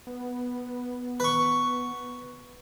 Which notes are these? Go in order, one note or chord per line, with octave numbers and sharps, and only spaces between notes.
B3
B4 C#6